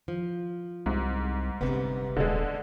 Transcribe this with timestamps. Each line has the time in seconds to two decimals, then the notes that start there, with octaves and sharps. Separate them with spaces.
0.08 F3
0.86 C2 G#2
1.61 G1 C3 B3
2.16 D#1 D3 G#3